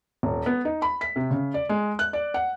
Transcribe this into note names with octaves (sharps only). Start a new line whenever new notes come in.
D#1
B3
D#4
B5
B6
C3
C#3
D5
G#3
F#6
D5
F#5